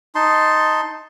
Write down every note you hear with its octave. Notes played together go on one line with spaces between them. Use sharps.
D#4 A5 C6